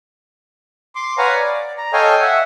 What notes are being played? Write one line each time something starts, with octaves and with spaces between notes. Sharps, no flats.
C6 D6
B4 C#5 F5 F#5 G#5 A#5
D5
A#5
A4 C#5 D#5 F5 G5 G#5
E5 F#5